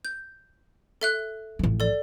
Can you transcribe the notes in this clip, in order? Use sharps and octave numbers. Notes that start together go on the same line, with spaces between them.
G6
A4 E5 F#6
A1 F3
A4 D5